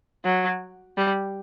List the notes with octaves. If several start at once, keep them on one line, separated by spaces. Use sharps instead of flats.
F#3
G3